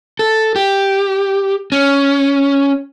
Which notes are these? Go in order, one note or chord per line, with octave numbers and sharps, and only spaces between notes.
A4
G4
C#4